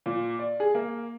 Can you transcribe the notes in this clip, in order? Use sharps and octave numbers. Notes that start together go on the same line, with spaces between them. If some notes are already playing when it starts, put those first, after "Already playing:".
A#2
D5
G#4
A#3